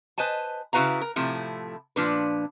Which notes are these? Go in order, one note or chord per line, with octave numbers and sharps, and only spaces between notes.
B4 C5 D#5 G#5 A5
C#3 E4 F#4 B4 F5 A#5
A#4
A2 C3 F3 A3 E4
A#2 F3 D4 B4